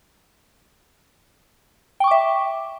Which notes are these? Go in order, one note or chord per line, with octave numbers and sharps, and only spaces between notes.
E5 G5 C#6 D6